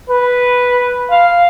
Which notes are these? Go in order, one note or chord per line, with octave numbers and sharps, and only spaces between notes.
B4
F5